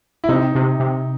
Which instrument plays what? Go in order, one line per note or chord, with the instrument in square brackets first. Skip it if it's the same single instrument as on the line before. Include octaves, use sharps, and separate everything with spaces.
[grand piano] E4
[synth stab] C3 [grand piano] D#4
[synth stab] C3
C3